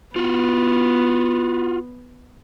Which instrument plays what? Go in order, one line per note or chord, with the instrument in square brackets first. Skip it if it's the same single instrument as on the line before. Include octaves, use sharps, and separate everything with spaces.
[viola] B3 [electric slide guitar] F4 F#4